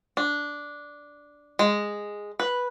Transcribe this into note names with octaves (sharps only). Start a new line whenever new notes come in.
D4
G#3
B4